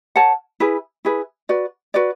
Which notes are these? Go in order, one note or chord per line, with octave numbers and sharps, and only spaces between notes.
A#4 C#5 F#5 A5
E4 G#4 B4
E4 G#4 B4
F#4 B4 D5
F#4 B4 D5